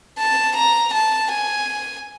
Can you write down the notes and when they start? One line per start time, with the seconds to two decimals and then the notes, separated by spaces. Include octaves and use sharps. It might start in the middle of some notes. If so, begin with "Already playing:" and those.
0.18 A5
0.56 A#5
0.93 A5
1.30 G#5